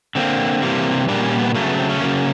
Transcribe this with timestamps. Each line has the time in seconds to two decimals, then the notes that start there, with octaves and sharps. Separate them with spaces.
0.15 D3 F#3 A#3 C4
0.62 C3 E3 G3 A#3
1.08 A#2 G3 A#3 D4
1.24 C#4
1.39 B3
1.55 C#3 F#3 A3 A#3
1.66 B3
1.78 C4
1.90 C#4
2.01 C#3 F#3 A#3